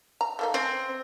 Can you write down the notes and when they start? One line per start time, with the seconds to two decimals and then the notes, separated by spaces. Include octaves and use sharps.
0.21 A#5
0.39 A3 A#3 D#4
0.54 C4 C#4